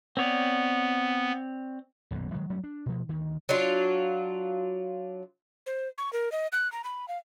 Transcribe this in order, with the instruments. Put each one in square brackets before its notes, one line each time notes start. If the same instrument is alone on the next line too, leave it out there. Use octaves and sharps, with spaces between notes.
[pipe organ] B3 [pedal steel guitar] C4 C#5 D5
[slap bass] D#1 B1 F#2 B2
D#3 E3 F#3 G#3
F#3 G3 A3 C#4
D4
B2 F3
D2 D#3
[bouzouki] F#3 D4 F4
[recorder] C5
C#6
A#4
D#5
F#6
A#5
B5
F5